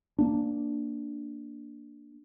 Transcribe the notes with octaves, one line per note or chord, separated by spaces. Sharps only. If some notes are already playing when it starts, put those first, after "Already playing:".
A#3 D4